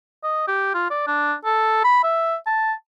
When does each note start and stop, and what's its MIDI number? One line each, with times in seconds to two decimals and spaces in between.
0.23 0.46 75
0.48 0.73 67
0.74 0.89 65
0.90 1.03 74
1.07 1.34 62
1.45 1.83 69
1.84 2.03 83
2.04 2.36 76
2.46 2.73 81